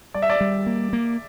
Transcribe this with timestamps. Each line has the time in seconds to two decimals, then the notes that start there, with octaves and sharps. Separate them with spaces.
0.14 G3 D5
0.22 E5
0.30 D5
0.41 G3
0.67 A#3
0.93 A#3